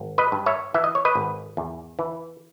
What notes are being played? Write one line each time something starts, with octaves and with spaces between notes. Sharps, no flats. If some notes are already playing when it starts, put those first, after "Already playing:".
Already playing: G#1
B4 D#5
G2
C#5 E5
E3 E5
D#5
C#5
B4 D#5
G#1
E2
E3